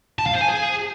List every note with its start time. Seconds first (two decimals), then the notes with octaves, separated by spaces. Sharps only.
0.19 A5
0.26 F5
0.34 C5
0.41 G#5
0.48 G#4